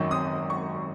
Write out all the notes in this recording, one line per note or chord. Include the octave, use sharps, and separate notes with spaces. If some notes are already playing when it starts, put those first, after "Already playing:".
Already playing: G#1 F#2 D#3 F#3 C#6
D#6
C#6